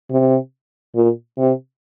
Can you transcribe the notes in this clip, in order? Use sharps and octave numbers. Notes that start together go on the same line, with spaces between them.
C3
A#2
C3